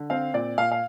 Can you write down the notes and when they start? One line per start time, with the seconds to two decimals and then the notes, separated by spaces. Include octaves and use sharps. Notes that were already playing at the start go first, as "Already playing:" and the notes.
Already playing: D3
0.10 C4 F5
0.34 A#2 D5
0.58 A#2 F5
0.72 F5